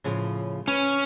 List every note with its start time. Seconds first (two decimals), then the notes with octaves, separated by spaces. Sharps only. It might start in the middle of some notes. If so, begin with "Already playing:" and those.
0.04 A2 C#3 F3
0.68 C#4 B4